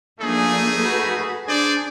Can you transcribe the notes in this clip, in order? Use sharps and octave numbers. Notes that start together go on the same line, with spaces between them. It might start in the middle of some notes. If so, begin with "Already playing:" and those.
F3 A3 A#3 D4 D#4 G#4
F#4 A4 B4
D4 G#4 C5 D5